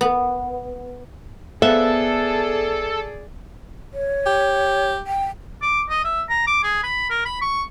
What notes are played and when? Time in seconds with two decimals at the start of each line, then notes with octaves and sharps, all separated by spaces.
0.01 B3
1.62 B3 G#4 A4 C5 D5 E5 F5
3.94 C#5
4.26 G4
5.07 G5
5.62 D6
5.89 D#5
6.04 E5
6.29 A#5
6.47 D6
6.63 G#4
6.83 B5
7.10 A#4
7.25 B5
7.41 C#6